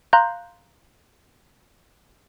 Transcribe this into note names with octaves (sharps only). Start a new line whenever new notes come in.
F5 A#5 C6 F#6 G6